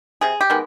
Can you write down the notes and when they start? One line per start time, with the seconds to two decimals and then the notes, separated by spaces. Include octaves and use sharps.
0.21 C3 G#4
0.41 G4
0.50 D#3 G#3 B3